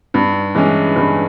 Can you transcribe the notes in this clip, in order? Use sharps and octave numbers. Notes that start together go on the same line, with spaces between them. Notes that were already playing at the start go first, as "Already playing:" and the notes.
G2
E3 G#3 C#4
G2